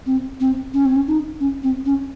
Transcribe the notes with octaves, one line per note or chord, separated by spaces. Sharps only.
C4
C4
C#4
C4
C#4
D#4
C#4
C4
C#4